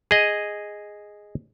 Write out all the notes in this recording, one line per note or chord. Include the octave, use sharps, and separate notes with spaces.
G#4 D#5